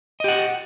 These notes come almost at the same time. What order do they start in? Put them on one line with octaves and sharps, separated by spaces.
D#5 G4 F#5